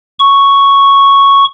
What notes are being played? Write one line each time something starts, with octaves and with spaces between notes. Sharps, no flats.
C#6